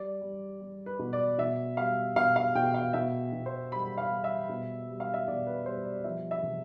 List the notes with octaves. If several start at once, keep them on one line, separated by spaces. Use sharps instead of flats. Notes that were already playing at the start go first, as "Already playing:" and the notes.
Already playing: G3 D5
G3
G3
B4
B2
D5
B2 E5
G3 F5
B2 F5
F5
B2 G5
F5
B2 E5
B2
C5
G3 B5
F5
G3
E5
B2
G3
F5
E5
B2 D5
B4
G3 C5
D5
F3 E5
E5
C3